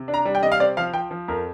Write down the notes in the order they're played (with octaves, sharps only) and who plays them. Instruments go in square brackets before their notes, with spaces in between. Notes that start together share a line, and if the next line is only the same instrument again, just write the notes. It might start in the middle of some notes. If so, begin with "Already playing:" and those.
Already playing: [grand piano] C3
D4
A#5
G3
G5
C3 D#5
F5
C4 D5
F3 F5
F3 G5
F3
F2 A#4